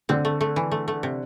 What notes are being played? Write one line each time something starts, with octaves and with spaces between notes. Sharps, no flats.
D3 C4
A3
A3
E3
A3
A3
C3